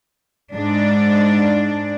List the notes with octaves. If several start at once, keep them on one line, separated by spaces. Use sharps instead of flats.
G#2 D4